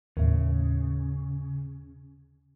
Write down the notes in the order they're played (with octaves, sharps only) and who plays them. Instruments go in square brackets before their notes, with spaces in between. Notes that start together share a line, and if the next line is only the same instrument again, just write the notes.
[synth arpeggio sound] D#2 A2 [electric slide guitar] C#3